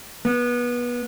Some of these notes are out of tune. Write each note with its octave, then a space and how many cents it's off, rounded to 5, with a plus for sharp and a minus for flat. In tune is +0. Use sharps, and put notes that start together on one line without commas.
B3 -25